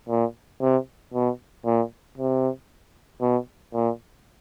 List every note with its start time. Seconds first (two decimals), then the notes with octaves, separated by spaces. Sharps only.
0.09 A#2
0.61 C3
1.13 B2
1.66 A#2
2.18 C3
3.21 B2
3.74 A#2